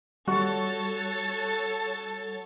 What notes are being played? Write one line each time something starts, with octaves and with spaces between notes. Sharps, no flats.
G3 F#4 A4 C#5 A6